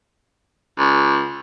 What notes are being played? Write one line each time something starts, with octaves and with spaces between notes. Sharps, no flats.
C#2